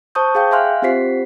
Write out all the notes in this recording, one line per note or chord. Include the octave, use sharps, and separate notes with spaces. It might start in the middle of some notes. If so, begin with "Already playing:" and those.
C5 A5 C#6 D#6 G6
G#4 F5 G5 G6
E5 F5 G#5 C6 F6 F#6
C4 F4 G4 C5 B6 C7